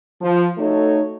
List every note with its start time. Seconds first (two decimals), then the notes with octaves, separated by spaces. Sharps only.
0.21 F3
0.58 A3 D#4 F#4 A4 C#5